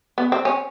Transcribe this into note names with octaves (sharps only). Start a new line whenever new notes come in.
B3
C4
C#4